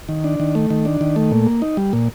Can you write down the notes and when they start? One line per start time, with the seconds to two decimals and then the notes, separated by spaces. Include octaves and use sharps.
0.09 D#3
0.24 D4
0.40 D#3
0.55 A3
0.70 D#3
0.85 D4
1.01 D#3
1.16 A3
1.31 A#2
1.47 A#3
1.62 D#4
1.77 G3
1.93 A#2